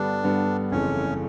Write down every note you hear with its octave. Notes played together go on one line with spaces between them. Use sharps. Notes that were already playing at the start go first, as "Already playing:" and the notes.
Already playing: G2 D3 G3 B3 D4
G2 D3 G3 B3
F#1 F2 C#3 E3 A3 C#4